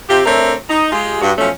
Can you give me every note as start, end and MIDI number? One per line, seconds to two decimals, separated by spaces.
0.09 0.21 48
0.09 0.21 60
0.09 0.21 65
0.09 0.21 67
0.25 0.54 57
0.25 0.54 60
0.25 0.54 62
0.25 0.54 70
0.25 0.54 73
0.25 0.54 76
0.70 0.89 63
0.92 1.20 56
0.92 1.20 65
0.92 1.20 67
1.21 1.31 43
1.21 1.31 66
1.38 1.49 40
1.38 1.49 53
1.38 1.49 54
1.38 1.49 57
1.38 1.49 61